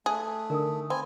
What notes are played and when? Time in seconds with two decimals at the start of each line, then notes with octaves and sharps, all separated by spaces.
0.06 A3 G#4 F#6
0.50 D3 D#4 A#4 G#5 D#6
0.90 C4 G#5 B5